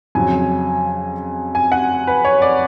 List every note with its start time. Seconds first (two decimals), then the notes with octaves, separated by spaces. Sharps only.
0.15 F2 C#3 F#3 G#5
1.55 G#5
1.72 F#5
2.07 B4
2.25 C#5
2.42 D5